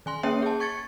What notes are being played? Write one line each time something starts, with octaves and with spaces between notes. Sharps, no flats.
D#3 G#5 C6
A#3 C#4 C#5 E5 G5
G#4 A5
C#6 G#6 A6 C#7